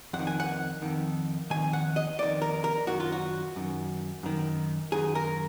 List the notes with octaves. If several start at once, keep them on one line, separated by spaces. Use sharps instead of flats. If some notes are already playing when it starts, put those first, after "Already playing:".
F2 F#5
D#3
G#5
F#5
F2 D#3
F2 D#3 G#5
F#5
D#5
F2 D#3 D5
A#4
A#4
F#2 D#3 F#4
F4
F#4
F#2 D#3
F#2 D#3
F#2 D#3 G#4
A#4